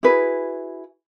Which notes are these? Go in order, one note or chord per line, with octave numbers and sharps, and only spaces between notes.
E4 F#4 G#4 B4